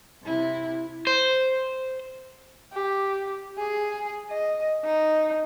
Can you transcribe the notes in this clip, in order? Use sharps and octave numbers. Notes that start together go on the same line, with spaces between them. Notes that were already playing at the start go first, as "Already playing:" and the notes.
C3 E4
C5
G4
G#4
D#5
D#4